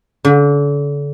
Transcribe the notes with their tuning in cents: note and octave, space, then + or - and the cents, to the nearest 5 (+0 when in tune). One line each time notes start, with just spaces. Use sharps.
D3 -35